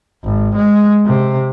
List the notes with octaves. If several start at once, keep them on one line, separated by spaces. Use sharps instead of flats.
G#1
G#3
C3